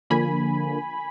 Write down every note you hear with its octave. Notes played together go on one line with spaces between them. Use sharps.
D3 F3 A#3 G#5 B5